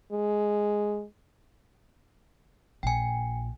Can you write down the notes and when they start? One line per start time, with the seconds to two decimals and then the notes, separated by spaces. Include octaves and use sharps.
0.12 G#3
2.83 A#1 G5 G#5